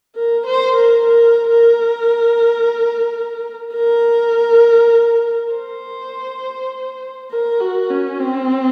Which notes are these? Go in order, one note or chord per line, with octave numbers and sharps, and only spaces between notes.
A#4
C5
A#4
A#4
A#4
A#4
C5
A#4
F#4
C#4
C4